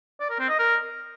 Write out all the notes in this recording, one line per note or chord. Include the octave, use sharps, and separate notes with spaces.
D5
A#4
C4
D#5
A#4